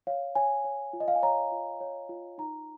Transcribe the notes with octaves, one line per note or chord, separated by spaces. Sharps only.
C#5 F5
C#5 G#5
C#5
F4
D#5
F5
G#5
C#5 A#5
F4
C#5
F4
D#4 A#5